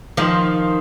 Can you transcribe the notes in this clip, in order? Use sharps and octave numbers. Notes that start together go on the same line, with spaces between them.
D#3 F3